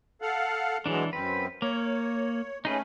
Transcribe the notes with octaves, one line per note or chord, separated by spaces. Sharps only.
A4 F5 F#5
B2 E3 F#3 G#3 D4
F#2 C4 B4
A#3 C#5
A3 C#4 D#4 G#4 B4